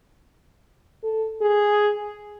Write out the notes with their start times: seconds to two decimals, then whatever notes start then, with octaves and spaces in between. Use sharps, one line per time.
1.03 A4
1.41 G#4